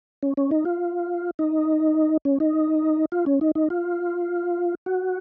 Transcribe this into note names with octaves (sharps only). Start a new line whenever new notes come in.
C#4
C#4
D#4
F4
D#4
C#4
D#4
F4
C#4
D#4
D#4
F4
F#4